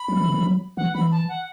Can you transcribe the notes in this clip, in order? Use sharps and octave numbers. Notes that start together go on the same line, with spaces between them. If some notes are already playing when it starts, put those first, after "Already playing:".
Already playing: B5
F#3
E3
D3
E3
F#3
E3 F#5
E3 B5
A5
F#5